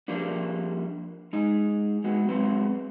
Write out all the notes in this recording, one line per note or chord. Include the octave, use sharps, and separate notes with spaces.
F3 G3 A#3 D4
G#3 D#4
G#3 B3 F#4
F#3 G#3 B3 C4